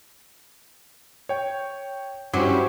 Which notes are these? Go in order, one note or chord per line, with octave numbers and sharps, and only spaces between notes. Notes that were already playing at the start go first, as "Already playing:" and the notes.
C#5 G5
G2 F#3 C#4 E4 G4 C5 D6